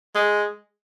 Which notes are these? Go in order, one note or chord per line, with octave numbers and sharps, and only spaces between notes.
G#3